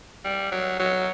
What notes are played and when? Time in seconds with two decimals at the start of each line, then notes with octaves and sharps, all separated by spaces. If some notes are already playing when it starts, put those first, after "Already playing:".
0.25 G3
0.52 F#3
0.80 F#3